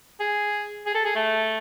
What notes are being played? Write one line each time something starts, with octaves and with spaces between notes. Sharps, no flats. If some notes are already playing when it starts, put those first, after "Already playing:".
G#4
G#4
A4
G#4
A3